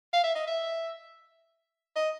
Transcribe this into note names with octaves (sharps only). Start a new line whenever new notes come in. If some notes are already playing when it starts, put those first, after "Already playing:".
F5
E5
D#5
E5
D#5